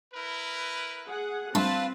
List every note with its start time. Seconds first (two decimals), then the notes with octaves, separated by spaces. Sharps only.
0.13 E4 A#4 B4
1.07 G#4 F#5
1.55 G3 A3 C4 D4 F4 B4 A5